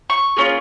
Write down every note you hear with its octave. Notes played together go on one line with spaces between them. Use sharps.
C#6
A#3 C#4 F4 G#4